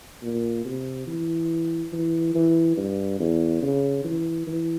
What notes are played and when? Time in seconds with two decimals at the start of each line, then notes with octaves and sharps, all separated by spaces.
0.22 A#2
0.65 C3
1.07 E3
1.93 E3
2.34 E3
2.77 G2
3.19 E2
3.63 C#3
4.04 E3
4.47 E3